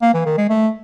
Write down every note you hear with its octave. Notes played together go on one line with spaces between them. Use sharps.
A#3
E3
D#3
G#3
A3